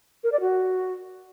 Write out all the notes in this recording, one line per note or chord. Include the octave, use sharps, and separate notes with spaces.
A#4
D5
F#4